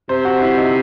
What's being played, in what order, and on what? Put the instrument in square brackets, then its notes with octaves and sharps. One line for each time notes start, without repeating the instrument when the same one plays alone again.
[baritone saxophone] C3 [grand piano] C5
[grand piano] F#4
E4
D#4